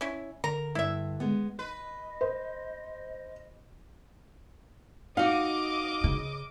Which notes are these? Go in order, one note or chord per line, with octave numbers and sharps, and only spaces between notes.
C#4 E4
D3 A#4 A#5
G2 E4 E5
G#3 B3
B4 D#5
C5
D#4 F#4 D#5 F5 D6
C#3